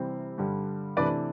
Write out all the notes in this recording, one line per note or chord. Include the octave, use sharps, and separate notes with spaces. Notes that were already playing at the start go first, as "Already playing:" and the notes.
Already playing: C3 E3 G3 C4
G2 D3 G3
C3 E3 A3 D4 B4 D5